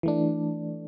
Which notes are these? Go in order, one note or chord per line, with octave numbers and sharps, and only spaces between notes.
E3 A3 D4